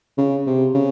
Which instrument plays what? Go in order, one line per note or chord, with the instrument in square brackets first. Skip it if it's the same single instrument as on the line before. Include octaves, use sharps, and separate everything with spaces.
[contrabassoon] C#3
C3
C#3